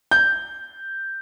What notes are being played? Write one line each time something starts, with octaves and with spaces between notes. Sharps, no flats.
G6